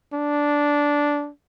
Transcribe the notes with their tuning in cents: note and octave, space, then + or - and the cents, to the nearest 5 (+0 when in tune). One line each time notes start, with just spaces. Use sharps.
D4 -10